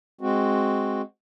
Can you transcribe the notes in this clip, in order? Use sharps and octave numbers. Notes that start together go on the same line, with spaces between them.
G#3 C4 F#4